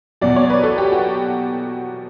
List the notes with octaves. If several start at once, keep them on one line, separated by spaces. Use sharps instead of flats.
E2 B2 F#3 D5
C#5
B4
A4
G4
F#4